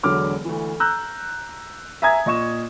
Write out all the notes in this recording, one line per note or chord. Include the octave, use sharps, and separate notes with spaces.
E1 D3 F#3 D6 F6
D2 E3
A#5 E6 F#6 G6
E5 G#5 A#5 D#6 G#6
A#2 D#5 C#6 E7